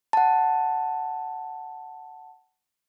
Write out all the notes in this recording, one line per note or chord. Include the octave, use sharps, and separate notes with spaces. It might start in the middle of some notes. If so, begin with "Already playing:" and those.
F#5 A5